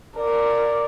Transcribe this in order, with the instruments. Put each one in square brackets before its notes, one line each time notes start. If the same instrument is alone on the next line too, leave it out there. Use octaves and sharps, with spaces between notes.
[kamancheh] A#4 [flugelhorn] D5